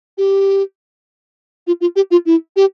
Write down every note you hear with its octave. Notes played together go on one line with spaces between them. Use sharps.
G4
F4
F4
G4
F4
E4
G4